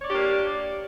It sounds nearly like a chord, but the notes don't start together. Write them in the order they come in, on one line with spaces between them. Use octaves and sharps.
C#5 D5 G4 D4 A#3